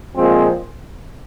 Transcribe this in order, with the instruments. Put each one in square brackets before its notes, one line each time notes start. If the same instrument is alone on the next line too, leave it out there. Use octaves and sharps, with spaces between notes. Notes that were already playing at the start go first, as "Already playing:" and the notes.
[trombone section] A#2 F3 G#3 C4